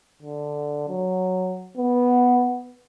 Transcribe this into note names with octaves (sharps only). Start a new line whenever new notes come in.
D3
F#3
B3